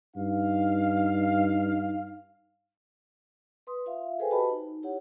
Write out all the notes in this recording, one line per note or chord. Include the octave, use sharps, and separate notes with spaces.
G2 D#4 F5
B4 C6 D#6
F4 E5 F5
G#4 A4 B4 C5 G5 G#5
F#4 G4 B4 D#5 A5 B5
D#4
E4 G4 C#5 F#5